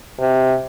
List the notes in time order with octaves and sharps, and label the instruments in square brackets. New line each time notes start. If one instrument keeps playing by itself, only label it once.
[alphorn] C3